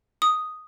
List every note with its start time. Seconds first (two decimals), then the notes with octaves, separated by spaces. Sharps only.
0.22 D#6